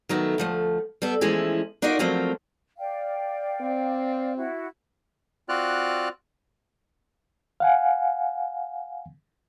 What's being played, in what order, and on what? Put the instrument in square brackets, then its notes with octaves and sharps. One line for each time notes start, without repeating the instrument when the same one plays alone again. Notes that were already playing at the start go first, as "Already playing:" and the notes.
[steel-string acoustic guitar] D#3 F#3 A3 B3
D2 F3 A3
G3 B3 A4
E3 F3 G#3 A3 C#4 E4
D4 D#4 F4 F#4 A#4 D5
F3 F#3 A3 A#3 C4
[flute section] D5 F5 G5
[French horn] C4
[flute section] E4 F#4
[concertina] C4 F4 F#4 D5 F6 F#6
[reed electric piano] F5 F#5 G#5